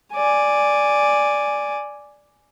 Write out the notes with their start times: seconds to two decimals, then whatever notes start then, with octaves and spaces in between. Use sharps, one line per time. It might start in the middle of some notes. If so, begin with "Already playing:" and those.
0.14 D5 G#5